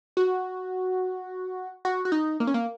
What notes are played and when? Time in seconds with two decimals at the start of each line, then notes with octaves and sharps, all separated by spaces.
0.17 F#4
1.85 F#4
2.05 F#4
2.12 D#4
2.40 A#3
2.47 C#4
2.54 A#3